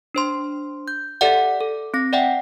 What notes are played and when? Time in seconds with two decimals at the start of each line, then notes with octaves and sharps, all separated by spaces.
0.15 D4 C5 C6
0.88 G6
1.21 G4 A4 D5 E5 F#5
1.60 A4
1.94 C4 A#6
2.13 D5 E5 F#5 G5